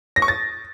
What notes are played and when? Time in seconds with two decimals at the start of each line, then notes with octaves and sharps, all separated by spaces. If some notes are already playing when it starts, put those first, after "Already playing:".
0.16 A#6
0.22 C#6
0.28 A6